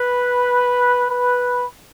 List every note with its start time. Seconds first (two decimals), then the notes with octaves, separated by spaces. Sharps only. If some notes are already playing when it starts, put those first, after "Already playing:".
Already playing: B4
1.10 B4